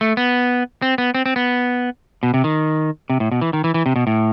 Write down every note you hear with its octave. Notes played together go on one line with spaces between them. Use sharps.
A3
B3
C4
B3
C4
C4
B3
B2
C3
D#3
C3
A2
B2
E3
D#3
E3
E3
C3
B2
A2